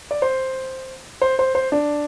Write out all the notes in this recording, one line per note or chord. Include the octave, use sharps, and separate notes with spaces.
D5
C5
C5
C5
C5
D4